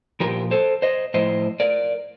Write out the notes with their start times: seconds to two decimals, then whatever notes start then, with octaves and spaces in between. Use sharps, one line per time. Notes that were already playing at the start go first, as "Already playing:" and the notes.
0.20 A#2 F3 G4 A#4
0.51 A4 C5
0.82 C5 D#5
1.14 A2 F3 C5 D#5
1.60 A#4 D5